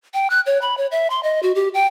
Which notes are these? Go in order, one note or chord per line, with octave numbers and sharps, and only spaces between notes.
G5
F#6
C#5
B5
C#5
E5
C6
D#5
F#4
G4
G5